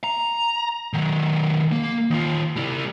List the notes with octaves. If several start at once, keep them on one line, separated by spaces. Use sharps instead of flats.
A#5
D#3 F#3
A#3
D#3 F4
G3 E4